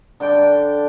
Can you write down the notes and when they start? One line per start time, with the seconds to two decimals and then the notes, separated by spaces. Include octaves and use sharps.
0.20 D3 D4 G5 D6